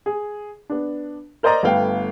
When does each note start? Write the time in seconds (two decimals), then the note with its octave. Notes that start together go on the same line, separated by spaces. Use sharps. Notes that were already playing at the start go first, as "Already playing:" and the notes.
0.06 G#4
0.70 B3 D4
1.43 A#4 C5 D5 D#5 A#5
1.63 G1 A3 B3 F5 G5